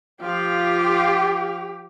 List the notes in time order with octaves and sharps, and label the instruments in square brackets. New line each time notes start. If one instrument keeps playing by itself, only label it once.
[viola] F3 F5 [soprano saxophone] F4 [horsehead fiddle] G4